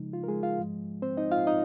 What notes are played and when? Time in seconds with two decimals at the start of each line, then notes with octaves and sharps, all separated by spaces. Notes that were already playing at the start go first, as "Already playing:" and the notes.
Already playing: C#3 F3 G#3 D#4
0.13 F4
0.24 A#4
0.28 G#3 G#4
0.43 F4 F5
0.58 G#2 F3 G#3
1.02 C4 C5
1.17 D#4 D#5
1.32 F4 F5
1.47 D#4 D#5